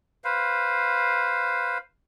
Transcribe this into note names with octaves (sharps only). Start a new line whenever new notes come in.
B4 C5 F5